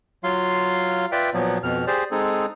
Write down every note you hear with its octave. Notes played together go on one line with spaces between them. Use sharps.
F#3 F4 F5 C6
F4 B4 D5 E5 G5
A#2 F3 F#3 B3
F2 B2 F6
G4 G#4 C5 D5
G#3 C4 D#4 G#4 A4